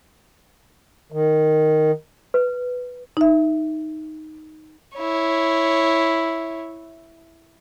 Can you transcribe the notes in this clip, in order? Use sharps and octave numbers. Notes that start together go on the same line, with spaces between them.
D#3
B4
D#4 E5
E4 C#5